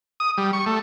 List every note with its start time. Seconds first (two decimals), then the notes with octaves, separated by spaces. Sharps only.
0.20 D#6
0.38 G3
0.53 C#6
0.66 A3